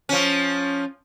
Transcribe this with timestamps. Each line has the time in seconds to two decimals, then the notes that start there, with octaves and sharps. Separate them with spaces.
0.09 F3 C#4